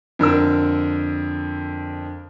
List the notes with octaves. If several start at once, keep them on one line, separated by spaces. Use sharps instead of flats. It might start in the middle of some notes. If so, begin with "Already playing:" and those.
F2 D3 A#4 E6